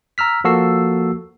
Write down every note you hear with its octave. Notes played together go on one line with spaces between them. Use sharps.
A#5 E6 F6 B6
F3 A#3 F#4 A4 E6 C7